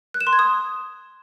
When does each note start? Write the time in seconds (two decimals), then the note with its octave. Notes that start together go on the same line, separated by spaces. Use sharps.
0.14 F#6
0.21 E7
0.27 C6
0.33 G#6
0.39 D#6